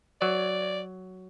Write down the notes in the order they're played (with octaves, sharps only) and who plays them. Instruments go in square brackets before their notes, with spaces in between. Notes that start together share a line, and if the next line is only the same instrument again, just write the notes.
[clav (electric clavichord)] F#3 [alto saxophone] D5